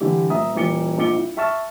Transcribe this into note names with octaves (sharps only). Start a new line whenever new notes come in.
D3 E3 G3 G4
D#1 E5 A#5 D#6
D#1 E3 D6 C#7 G7
A#1 C4 D#4 D6 C#7 G7
E4
E5 A5 C#6 F6 A6 E7